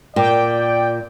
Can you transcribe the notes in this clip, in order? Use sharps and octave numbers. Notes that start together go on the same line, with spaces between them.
A#2 D5 G5